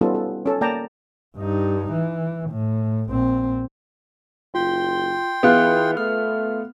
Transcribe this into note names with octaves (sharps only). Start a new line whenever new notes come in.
G3 B3 C#4 D#4 F4 A4
A4
C#4 A4
A#3 D5 G5 A5 A#5
G2 D#4
E3
A2
A#1 C4
F#1 F4 G5 C6
E3 B3 F4 G#4 F#6
A3 F6